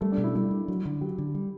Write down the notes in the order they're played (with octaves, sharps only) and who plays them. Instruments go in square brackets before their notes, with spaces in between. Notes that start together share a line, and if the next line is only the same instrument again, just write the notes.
[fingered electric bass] G3 [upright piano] A3
[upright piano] D4
[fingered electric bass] B2
[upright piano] E4
[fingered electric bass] G3 [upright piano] E4
[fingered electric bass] D4
F#3
D3
[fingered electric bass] F#3 [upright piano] G4
[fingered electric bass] D3
G3